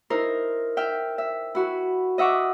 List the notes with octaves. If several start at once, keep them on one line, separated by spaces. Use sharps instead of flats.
D#4 E4 A#4 C5
E5 G5 F6
E5
E4 F#4 B5
D#5 E5 F#5 C#6 D6